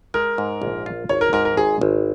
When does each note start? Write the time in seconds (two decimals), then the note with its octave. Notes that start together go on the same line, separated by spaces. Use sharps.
0.14 G#3 A#4
0.38 G#2
0.62 A#1
0.86 F4
1.09 G#1 C#5
1.21 A#4
1.33 G#2 A#4
1.45 A#4
1.57 G#1 G#4
1.81 G#1